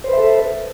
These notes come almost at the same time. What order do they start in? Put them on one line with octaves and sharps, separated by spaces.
C5 B4 E5 A4